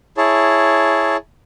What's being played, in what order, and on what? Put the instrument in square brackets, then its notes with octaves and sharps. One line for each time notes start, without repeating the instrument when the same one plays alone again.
[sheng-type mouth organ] E4 G#4 C#5 A5